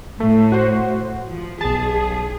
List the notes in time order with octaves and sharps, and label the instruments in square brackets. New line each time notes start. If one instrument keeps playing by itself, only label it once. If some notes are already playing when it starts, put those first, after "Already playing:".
[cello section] A2 [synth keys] A3
[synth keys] F#4 C5
[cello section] F3
[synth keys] B1 A5 [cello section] G#4